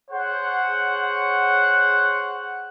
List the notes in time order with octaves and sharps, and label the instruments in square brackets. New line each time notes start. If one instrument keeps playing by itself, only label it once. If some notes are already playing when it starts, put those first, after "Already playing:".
[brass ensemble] G#4 C5 C#5 F#5